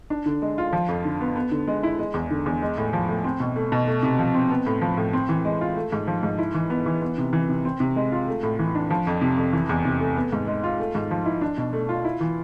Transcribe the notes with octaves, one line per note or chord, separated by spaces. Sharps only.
D4
D3
G#3
F4
F3
F2
D3
B3
B3
D3
G#3
E4
G#3
E2
D3
E2
G#3
A2
F3
A2
C4
B2
A3
B2
A3
C3
F3
C4
B3
A2
F3
A2
C4
E3
G#3
F4
A3
G#2
F3
G#2
E4
E3
B3
E3
B3
C3
E3
C3
C4
C3
G#3
F4
A3
A2
E3
D4
F3
F2
C3
F2
E3
E2
C3
A3
B3
G#2
G#3
F4
A3
G#2
F3
E4
D4
B2
A3
F4
E4
E3